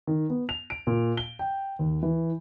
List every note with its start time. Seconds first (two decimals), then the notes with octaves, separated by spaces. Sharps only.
0.07 D#3
0.30 B3
0.49 F7
0.70 D7
0.87 A#2
1.17 G7
1.39 G5
1.79 D#2
2.03 E3